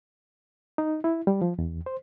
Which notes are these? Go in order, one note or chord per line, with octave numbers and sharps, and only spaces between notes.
D#4
E4
G3
F3
E2
C5